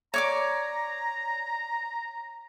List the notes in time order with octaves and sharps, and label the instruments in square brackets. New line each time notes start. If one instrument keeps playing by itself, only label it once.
[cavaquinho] C#5 D5 D6 [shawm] A#5